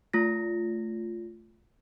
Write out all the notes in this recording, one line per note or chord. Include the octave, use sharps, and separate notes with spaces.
A3 F4 A#6